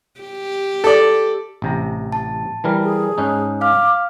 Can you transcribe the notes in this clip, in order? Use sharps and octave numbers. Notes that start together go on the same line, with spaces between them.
G4
A4 D5
A1 C3 A#5
A5
E3 G3 A#4
G#4
G#2 C#4 D#4
F5 D6 F6